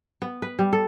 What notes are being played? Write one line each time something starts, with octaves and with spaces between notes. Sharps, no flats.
B3
B4
G3
A4